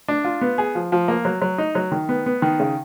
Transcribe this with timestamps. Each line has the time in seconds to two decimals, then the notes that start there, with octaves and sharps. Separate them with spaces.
0.08 D4
0.24 F4
0.41 B3
0.58 G#4
0.75 F3
0.92 F3
1.08 A#3
1.25 F#3
1.42 F#3
1.58 D#4
1.75 F#3
1.91 D#3
2.09 B3
2.26 B3
2.42 D#3
2.60 C#3